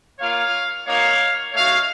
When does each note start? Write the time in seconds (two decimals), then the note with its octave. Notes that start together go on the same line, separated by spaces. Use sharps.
0.19 A#3 F4 C#5 F5
0.86 A#3 D#4 F#4 C#5 F5
1.53 A3 D#4 F#4 C#5 F5